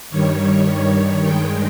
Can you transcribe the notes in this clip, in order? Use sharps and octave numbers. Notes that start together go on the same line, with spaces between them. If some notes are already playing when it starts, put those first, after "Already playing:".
G2 D#3 G3 C#5
G2 D#3 G#3 G5